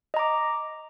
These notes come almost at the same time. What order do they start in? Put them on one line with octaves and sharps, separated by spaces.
D#5 A#5 D6